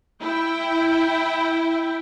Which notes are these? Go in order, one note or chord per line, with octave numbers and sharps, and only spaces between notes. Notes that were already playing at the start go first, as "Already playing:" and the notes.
E4 G5